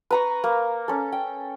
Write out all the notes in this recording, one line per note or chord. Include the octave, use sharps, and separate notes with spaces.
B4 A#5 C#6
A#3
C#4 A4
G5